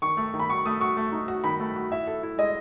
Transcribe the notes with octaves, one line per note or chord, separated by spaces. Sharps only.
D#3 C#6
A3
D#3
B5
F#4 C#6
A3 D#6
F#4 C#6
A3
D#4
F#4
D#3 B5
A3
F#4
E4 E5
A4
E4
G#3 D#5